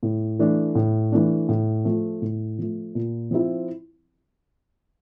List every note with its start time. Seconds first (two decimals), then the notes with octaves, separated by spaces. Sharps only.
0.03 A2
0.39 E3 A3 D4
0.75 A2
1.12 E3 A3 D4
1.49 A2
1.85 F3 A3
2.22 A2
2.59 F3 A3
2.95 A#2
3.31 F3 C4 E4